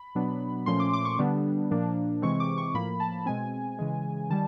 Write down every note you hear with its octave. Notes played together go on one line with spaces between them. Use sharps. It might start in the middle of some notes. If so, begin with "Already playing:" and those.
Already playing: B5
B2 F#3 B3 D4
A#2 F3 A3 C#4 C6
D6
D6
C#6
D3 G3 B3 D4
A#2 F3 A#3 D4
C3 E3 G#3 C4 C#6
D6
C#6
A2 F3 A#3 B5
A5
B2 G#3 C4 G#5
C#3 E3 G#3
D#3 G3 A5